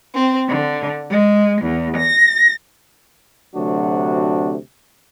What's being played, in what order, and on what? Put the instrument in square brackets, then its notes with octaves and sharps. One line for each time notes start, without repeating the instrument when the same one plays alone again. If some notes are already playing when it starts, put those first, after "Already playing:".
[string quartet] C4
D3
G#3
E2
A#6
[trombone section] D2 C3 F#3 D4 F#4